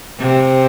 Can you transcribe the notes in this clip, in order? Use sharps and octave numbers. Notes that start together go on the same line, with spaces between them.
C3